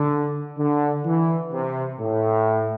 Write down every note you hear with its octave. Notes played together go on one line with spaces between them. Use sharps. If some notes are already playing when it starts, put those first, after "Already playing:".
Already playing: D3
D3
E3
C3
A2